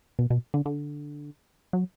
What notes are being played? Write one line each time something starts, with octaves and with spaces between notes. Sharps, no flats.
B2
B2
D3
D3
F#3